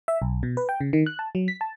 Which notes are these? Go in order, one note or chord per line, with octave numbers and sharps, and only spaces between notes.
E5
B1
B2
B4
G5
C#3
D#3
F#6
A5
F#3
B6
A5